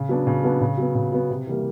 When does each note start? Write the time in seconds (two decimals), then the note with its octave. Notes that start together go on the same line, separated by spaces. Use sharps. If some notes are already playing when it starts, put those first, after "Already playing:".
Already playing: C#3
0.09 F#3 B3 D4
0.27 C#3
0.44 F#3 B3 D4
0.61 C#3
0.78 F#3 B3
0.95 C#3
1.12 F#3 B3
1.30 C3
1.47 E3 G3 A#3